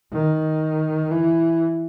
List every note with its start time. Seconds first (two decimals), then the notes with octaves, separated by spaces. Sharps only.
0.12 D#3
1.11 E3